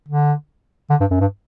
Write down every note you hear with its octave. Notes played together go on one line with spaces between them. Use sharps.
D3
D3
G2
F#2
G2